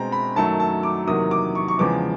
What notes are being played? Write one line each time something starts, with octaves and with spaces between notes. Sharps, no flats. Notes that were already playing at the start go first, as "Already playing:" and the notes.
Already playing: B2 G#3 C4 A#5
B5
F#2 D#3 F#3 A3 A5
A5
D6
E2 C3 D#3 F#3 A#3 D#6
D6
C#6
C#6
E2 C#3 F3 G#3 B3 D6